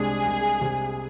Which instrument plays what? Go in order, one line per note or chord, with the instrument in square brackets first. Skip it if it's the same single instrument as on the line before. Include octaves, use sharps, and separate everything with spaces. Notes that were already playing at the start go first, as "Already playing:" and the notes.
Already playing: [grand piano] C2 C3 G#3 D4 [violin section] G#4
[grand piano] C2
C3